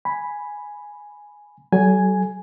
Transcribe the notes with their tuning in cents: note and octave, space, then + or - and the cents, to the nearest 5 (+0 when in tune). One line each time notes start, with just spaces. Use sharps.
G#5 +0 B5 +0
F#3 +40 A4 -30 G#5 +0